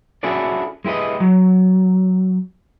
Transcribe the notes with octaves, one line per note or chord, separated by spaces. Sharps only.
C#4 E4 F#4 G#4 A4 D5
G#3 E4 G4 B4 D#5
F#3